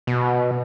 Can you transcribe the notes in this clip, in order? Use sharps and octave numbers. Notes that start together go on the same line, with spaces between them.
B2